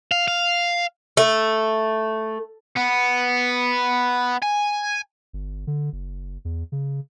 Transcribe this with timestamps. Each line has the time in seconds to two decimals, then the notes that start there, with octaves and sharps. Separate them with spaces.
0.12 F5
0.28 F5
1.17 A3
2.77 B3
4.42 G#5
5.33 G1
5.67 D3
5.93 F#1
6.45 E2
6.72 C#3